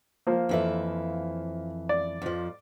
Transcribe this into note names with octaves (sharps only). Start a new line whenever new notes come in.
F3 A#3
F2 E3 E5
D5
F2 F3